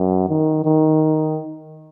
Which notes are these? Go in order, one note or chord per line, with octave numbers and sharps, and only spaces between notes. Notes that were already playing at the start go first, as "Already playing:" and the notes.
Already playing: F#2
D#3
D#3